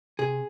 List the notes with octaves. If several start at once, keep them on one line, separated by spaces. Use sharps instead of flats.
C3 G#4